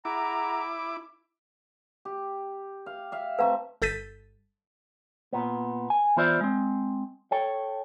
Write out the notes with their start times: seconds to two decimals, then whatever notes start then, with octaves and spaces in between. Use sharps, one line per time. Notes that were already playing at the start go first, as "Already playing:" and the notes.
0.05 E4 G#4 F#5 A#5 D6
2.05 G4
2.86 F5
3.12 E5 F5
3.39 A3 C4 B4 F5 A#5 C#6
3.82 G1 A4 G6 A6 B6 D#7
5.33 A#2 B3
5.90 G#5
6.17 E3 B3 F4 C5 D5 E5
6.41 G#3 C4
7.31 A4 C#5 G5